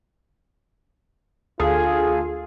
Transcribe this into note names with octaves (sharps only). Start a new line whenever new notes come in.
D2 F4 G#4 A4 F5